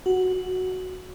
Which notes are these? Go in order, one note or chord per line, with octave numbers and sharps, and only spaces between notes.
F#4